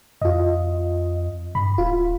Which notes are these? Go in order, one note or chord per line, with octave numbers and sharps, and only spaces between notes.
F2 F4 D#5
G2 B5
D1 F4